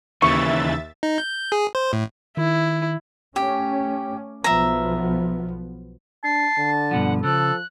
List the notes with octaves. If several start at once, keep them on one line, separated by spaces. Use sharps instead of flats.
D#2 C#3 E3 E5 C#6 A6
D#4
G6
G#4
C5
A2
D#3 E4
A3 C#4 G4
B1 F3 B3 E5 A#5
D4 A5 C7
D3
G2 B2 F3 F#5
C#3 F3 A4 F#6